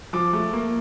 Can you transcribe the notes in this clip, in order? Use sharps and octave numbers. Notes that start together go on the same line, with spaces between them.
F3 D6
A3
A#3